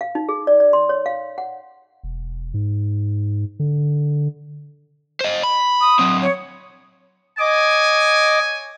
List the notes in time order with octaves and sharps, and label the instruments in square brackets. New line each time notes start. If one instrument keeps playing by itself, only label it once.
[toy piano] F5
D#4
G#4
D5
D5
C6
C#5
F5
F#5
[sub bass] E1
G#2
D3
[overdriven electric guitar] C5 D#5
B5
[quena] D#6
[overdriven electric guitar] F#3 C4
[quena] C#5
[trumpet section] C#5 G#5 [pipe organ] D#5 D6